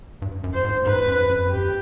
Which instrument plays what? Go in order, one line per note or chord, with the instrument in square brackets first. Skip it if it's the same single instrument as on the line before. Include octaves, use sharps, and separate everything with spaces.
[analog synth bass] G2
F#2
[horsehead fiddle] C5
[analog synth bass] G#2
[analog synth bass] G#2 [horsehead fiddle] B4
[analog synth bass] F#2
F#2
F#2
[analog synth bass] G2 [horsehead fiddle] G4